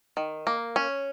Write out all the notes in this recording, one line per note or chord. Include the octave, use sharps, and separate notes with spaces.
D#3
A#3
C#4